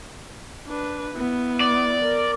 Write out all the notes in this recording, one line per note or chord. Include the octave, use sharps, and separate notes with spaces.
D4 B4
B3 E4
D5
A#4